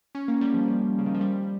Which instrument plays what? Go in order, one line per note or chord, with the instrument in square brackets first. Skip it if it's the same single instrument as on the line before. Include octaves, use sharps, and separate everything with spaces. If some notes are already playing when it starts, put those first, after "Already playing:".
[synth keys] C#4
A#3
G3
F3
F3
C#3
D#3
F3
G3